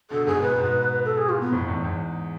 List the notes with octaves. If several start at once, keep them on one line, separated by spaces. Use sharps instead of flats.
B2 D3 A4
G#2 B2 G#4
G#2 B2 B4
G#2 B2
A4
G#4
F4
B3
F2 A2
E2 G#2
E2 G#2